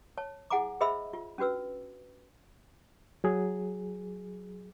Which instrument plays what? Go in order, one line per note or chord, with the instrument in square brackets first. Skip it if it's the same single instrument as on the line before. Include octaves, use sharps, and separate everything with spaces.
[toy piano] C#5 A5
E4 G#4 F#5 G#5 A#5 D6
G#4 C5 D#5 E5 B5 E6
F4
C#4 D4 F#4 B4 E6
[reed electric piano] F#3 G#4